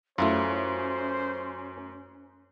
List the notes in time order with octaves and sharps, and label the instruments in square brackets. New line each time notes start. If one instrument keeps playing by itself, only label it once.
[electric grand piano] F#2 [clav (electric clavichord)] A3 E4 F4 [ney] C#4 [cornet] C5